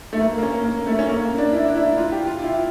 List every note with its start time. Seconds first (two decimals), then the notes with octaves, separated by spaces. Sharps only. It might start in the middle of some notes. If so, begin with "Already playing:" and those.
0.13 A3
0.21 A#3
0.38 A#3
0.43 C#4
0.64 A#3
0.87 A3
0.99 C#4
1.09 A#3
1.24 A#3
1.38 D4
1.53 E4
1.69 D4
1.75 E4
1.98 F4
2.12 G4
2.27 F4
2.42 E4